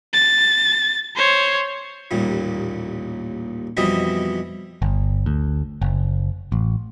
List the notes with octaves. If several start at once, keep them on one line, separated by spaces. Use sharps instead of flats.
A6
C5 C#5
A1 D#2 A#2 G3
F2 B2 E3 G3 D#5 E5
G1
D2
F#1
A1